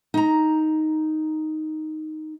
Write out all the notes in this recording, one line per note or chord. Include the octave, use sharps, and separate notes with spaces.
D#4 A#5